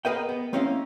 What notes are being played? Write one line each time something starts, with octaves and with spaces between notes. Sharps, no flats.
G#4 A#4 B4 D#5 F#5 G5
B3
A#3 C4 C#4 E4 D#5 F5